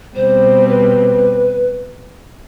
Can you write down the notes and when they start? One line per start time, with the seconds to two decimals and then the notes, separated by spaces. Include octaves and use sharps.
0.16 B2 G3 C4 C5
0.68 B4